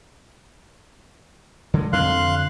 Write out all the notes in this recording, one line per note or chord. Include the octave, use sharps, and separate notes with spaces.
D3 G#3
F2 D3 C4 F5 C6 F#6